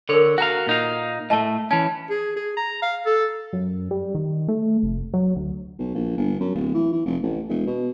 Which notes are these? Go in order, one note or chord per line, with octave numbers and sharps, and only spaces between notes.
D3 A4 A#4 C#5
F#4 F5 F#5 A#5
A#2 D#4 F5
A2 A3 D#5 A5
E3 C#4 A5
G#4
G#4
A#5
F5
A4
F#2
G3
D#3
A3
F1
F#3
D2
B1
A#1
G1
F#2
D1
E3
E3
F1
A1
E1
B2